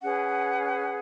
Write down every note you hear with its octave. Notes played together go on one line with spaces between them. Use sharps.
C#4 G#4 B4 F#5